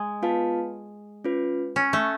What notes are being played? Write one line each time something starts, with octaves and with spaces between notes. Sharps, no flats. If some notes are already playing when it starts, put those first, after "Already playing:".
Already playing: G#3
B3 F4 B4 F5 A5
C#4 F4 B4
C#4
A3